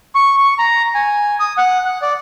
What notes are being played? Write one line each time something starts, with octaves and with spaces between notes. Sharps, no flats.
C#6
C#6
A#5
G#5
D#6
F#5
F#5
D5